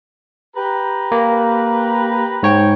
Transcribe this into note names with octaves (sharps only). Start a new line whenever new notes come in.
G4 B4 A#5
A#3
G#2 C#5 G5